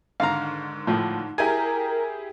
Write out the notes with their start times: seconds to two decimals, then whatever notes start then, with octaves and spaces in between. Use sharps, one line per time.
0.20 G#2 D3 D#3 F5 A#5
0.87 A2 F3
1.38 E4 G4 G#4 A#4 G#5